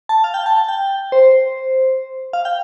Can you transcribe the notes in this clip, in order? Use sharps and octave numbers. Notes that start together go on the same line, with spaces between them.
A5
F5
G5
A5
A5
G5
C5
F5
G5